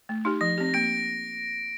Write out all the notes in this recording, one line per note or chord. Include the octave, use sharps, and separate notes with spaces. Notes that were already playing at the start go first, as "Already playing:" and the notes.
A3
D#4 G4
F3 A#6
C4 G4
A#3 A#6 D7